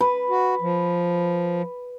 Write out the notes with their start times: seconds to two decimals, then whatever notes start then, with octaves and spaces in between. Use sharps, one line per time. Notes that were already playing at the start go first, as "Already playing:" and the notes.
0.01 B4
0.29 F#4
0.61 F3